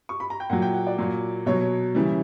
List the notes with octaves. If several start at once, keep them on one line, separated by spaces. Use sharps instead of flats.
C#6
B5
A#5
G5
A#2 F#3 F#5
G5
F#5
D5
A#2 F#3
B2 F#3 C#5
C#3 E3 G3